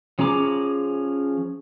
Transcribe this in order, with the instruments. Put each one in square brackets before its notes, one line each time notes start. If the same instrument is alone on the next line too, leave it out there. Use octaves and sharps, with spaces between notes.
[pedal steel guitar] F3 C#4 G#4 A#5 D6